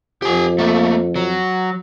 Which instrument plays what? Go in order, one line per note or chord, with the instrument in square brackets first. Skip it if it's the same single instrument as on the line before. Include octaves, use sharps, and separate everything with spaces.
[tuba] F2 [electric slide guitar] G4 G#5
[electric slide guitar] A3 A#3
F#3